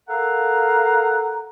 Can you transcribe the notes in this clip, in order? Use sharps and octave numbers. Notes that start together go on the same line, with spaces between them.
A4 A#4 F5 F#5 A#5